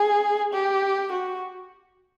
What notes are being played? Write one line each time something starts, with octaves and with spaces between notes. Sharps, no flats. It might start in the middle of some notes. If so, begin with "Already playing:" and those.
Already playing: G#4
G4
F#4